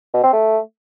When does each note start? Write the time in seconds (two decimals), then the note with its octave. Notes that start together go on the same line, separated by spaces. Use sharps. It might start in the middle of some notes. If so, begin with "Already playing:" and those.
0.14 B2
0.23 C4
0.33 A3